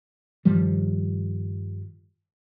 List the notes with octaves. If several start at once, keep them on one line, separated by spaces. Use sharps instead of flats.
G2 D#3 F3 G3